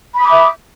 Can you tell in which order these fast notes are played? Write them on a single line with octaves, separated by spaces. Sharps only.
B5 D#6 D6 E5